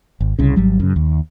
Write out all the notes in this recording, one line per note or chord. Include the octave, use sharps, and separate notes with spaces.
G#1
C2 C#3
G#1 F#3 G3
F#2 C#3
D#2